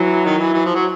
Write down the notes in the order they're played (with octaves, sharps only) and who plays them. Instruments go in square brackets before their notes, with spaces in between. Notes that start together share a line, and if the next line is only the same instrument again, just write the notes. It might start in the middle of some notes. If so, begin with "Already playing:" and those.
Already playing: [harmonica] E3 [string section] F#3
[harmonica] D#3
E3
E3
F3
F#3